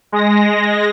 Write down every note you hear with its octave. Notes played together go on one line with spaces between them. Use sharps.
G#3 A#6